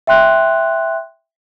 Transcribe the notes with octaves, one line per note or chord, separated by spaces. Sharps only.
E5 G5 C6 F#6